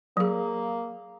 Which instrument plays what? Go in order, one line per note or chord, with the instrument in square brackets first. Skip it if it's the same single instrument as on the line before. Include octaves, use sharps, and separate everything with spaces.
[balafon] F#3 G#4 [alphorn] A#3